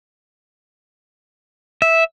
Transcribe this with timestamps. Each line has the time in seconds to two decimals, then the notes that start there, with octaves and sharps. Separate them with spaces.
1.82 E5